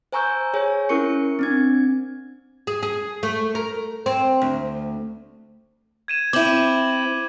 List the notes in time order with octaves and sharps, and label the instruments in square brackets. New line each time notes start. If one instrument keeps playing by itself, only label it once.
[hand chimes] C5 G#5 A#5 C#6 E6 G6
G#4 C#5 G#5
C#4 E4 A#4 C#6 C#7
C4 D4 G#6
[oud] G#4
G#4
A3
A#4
C4
D2
[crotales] G#6 D#7 E7
[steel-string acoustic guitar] C4 E4 [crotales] D6 F#7